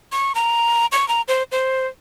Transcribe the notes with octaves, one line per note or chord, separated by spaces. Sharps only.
C#6
A#5
C#6
A#5
C5
C5